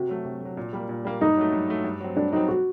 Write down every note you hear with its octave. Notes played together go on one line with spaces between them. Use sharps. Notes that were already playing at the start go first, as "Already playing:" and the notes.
Already playing: C3 F#4
F#3 A3
C3
F#3 A3
A#2
G3 A#3
A#2
G3 A#3
G2 D#4
F#3 A3
G2
F#3 A3
G2
F#3 C4
G2 D4
F#3 C4 D#4
F#4